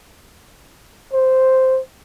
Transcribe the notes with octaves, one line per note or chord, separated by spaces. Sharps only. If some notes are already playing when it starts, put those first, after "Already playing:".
C5